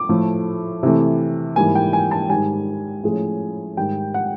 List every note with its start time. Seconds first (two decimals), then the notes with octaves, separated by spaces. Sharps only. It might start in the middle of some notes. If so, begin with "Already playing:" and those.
Already playing: D6
0.09 A2 F3 A3
0.83 C3 E3 A3
1.56 G#2 E3 G3 A#3 G#5
1.75 G5
1.93 G#5
2.11 A5
2.30 G#2 D#3 G3 G#5
3.04 A2 F3 G#3 C#4
3.77 G#2 D#3 G3 G5
4.14 F#5